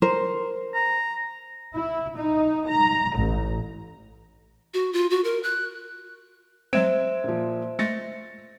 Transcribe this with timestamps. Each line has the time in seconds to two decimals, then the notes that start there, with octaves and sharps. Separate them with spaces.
0.02 A#4 C5
0.74 A#5
1.76 E4
2.18 D#4
2.68 A#5
3.18 A1
4.74 F#4
4.93 F4
5.10 F#4
5.24 A#4
5.43 F#6
6.73 F#3 G#3 C4 C5 E5 G#6 D7 E7
7.24 A#2 F3
7.79 G#3 A3 A6 A#6 C#7